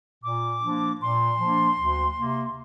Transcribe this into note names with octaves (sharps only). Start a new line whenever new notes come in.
A#2 D6
F3 A#3 D4
A#2 C6
F3 A#3 D4
D2
C3 A#3